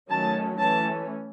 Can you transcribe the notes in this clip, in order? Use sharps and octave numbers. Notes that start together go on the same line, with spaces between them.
D#3 F#3 A3 C#4 A5
E3 A3 C#4 A5